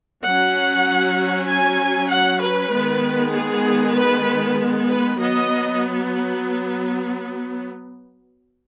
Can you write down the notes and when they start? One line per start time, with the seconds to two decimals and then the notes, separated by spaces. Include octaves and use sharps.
0.24 F#3 C#4 F#5
1.48 G#5
2.10 F#5
2.41 B4
2.72 D#3 G#3 B3
3.34 G#4
3.96 B4
4.88 B4
5.19 F#3 B3 D#5